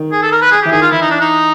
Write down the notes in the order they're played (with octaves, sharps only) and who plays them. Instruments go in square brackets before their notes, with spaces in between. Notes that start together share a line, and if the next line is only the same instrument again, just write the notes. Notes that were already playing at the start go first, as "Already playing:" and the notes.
Already playing: [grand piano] D#3
[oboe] G#4
A4
A#4
B4
G#4
[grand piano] E3 [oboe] G4
[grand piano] D#3 [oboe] G#4
[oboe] F4
[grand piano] E3 [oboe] E4
[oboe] D#4
D4
D#4